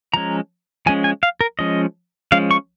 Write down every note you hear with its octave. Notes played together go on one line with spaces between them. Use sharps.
F3 G#3 C#4 A#5
F3 G#3 C#4 G#5
G#5
F5
A#4
F3 G#3 C#4 D#5
F3 G#3 C#4 F5
C#6